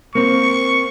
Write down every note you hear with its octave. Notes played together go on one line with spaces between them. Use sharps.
A#3 C4 C#6